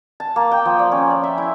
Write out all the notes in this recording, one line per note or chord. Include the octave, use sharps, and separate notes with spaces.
A5
A#3
G5
F3
D5
C#4
D5
E5
E4